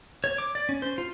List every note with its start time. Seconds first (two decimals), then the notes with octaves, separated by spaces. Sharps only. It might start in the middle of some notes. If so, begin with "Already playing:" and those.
0.24 C#5
0.38 D6
0.55 D5
0.69 C#4
0.82 C5
0.98 F4